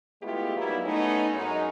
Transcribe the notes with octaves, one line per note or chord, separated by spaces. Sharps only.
G#3 A3 B3 E4 F4 G4
F#3 G3 A#3 B3 D#4 E4
A3 B3 C#4 D#4
F#2 G#3 C#4 D#4